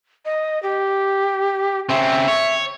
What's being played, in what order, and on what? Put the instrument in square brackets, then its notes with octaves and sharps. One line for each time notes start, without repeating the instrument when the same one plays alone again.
[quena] D#5
G4
[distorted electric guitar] C#3 C4 [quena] E5
[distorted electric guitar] C#5